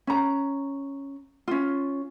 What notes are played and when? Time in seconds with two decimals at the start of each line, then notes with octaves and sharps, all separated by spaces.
0.07 C#4 A#5
1.48 C#4 F4